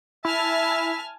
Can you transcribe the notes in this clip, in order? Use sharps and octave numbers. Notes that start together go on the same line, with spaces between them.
E4 E5 G#5 A5 F6